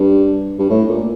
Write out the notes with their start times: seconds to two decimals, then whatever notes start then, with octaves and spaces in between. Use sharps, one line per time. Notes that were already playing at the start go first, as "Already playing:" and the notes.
Already playing: G2
0.59 G2
0.70 A2
0.89 A#2